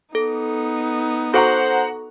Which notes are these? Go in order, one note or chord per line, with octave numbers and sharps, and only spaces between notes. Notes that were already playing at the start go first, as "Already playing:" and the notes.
B3 D#4 A4
F#4 A4 C5 F#5 A#5 C#6